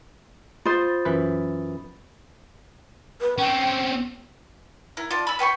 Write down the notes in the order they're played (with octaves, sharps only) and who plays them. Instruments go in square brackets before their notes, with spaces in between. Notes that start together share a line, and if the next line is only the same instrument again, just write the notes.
[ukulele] F4 C5 [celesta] B5 D#6 A6
[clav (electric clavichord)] F#2 E3 B4
[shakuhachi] B4
[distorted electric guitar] C4 C#4 [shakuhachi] G5
[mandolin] E4 A#4
D4 F4
B5 E6
B4 G5 C6 C#6